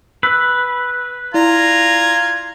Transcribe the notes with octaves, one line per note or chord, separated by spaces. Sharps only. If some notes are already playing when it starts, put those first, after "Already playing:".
B4 E6 F#6
E4 F4 D5 A#5 G#6